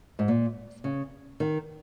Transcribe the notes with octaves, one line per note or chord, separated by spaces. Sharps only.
G#2
A#2
C#3
D#3